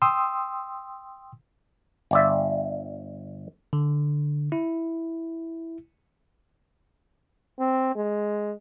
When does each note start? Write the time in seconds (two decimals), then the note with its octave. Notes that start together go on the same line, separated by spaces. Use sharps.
0.02 G5 C6 D#6 E6
2.11 G1 D5 E5
3.73 D3
4.52 E4
7.59 C4
7.95 G#3